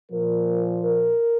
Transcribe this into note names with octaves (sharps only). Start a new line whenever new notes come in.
A#2 F3 A#4
A#4